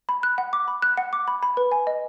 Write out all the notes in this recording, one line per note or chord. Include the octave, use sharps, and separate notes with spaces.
B5
F#6
F#5
D6
B5
F#6
F#5
D6
B5
B5
B4
G#5
D#5